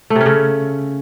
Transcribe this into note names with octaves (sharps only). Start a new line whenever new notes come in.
A3
C3
C#4
C#3